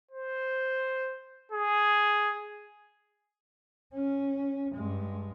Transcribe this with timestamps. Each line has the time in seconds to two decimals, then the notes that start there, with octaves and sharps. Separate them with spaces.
0.11 C5
1.52 G#4
3.94 C#4
4.74 G2 G#3